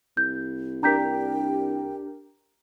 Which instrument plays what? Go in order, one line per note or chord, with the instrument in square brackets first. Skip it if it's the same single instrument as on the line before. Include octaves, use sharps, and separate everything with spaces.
[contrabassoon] C2 [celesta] G6
[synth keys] D4 G4 A#4 [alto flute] G5 [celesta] A#5 G6 B6